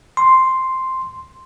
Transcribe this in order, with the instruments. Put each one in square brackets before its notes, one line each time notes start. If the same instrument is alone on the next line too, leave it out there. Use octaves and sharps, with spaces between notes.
[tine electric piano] C6